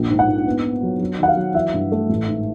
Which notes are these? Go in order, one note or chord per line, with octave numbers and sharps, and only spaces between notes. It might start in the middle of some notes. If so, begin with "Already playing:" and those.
Already playing: A#1 A#3
G#2
F#5
G#2
B3
B3
F#3
F#3
D#3 F#5
F5
F#3
E3 E5
G2
A3
A1
G#2